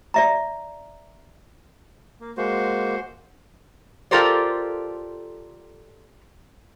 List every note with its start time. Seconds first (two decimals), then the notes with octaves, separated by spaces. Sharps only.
0.14 D5 E5 A#5
2.21 A#3
2.37 G#3 A#3 F#4 C5
4.11 F4 G4 A4 A#4 C5 D5